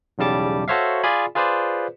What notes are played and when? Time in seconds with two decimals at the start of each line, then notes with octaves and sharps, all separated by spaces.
0.18 B1 E2 C#3 G3 A5 D6
0.68 F#4 A4 C5 C#5 E5 F5
1.03 F4 G#4 D5 G#5 B5
1.35 F4 G#4 B4 C5 D5